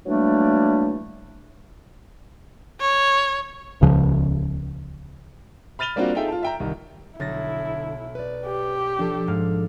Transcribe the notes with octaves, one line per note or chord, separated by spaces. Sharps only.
E3 F#3 G3 A3 A#3 D4
C#5
D#1 C#2 C#3 F3
B5 F6 A6 D#7 F7 G7
G3 A#3 C4 D4 F4 F#4
D#4 F4 G#4 A4 E5 G5
F4 A5
E5 G5 A#5
C2 D#3
B1 D3 E4 A6 A#6
B4 D5
G4
F3 D4 A4
G#2 F5